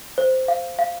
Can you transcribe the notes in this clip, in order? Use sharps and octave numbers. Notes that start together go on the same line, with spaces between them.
C5
F5
F5